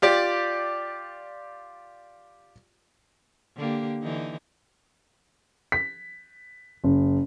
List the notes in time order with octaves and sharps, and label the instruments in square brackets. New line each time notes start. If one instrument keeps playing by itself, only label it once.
[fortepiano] F4 G4 D5
[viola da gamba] D3 A#3 G4
D3 E3 D#4
[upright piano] B6
F#1